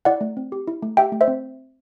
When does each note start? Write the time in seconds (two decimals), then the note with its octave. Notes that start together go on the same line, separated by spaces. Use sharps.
0.05 E4 D5 F#5
0.21 A3
0.37 C4
0.52 G4
0.67 E4
0.82 A3
0.97 G4 E5 G5
1.12 A3
1.21 C5 E5
1.28 C4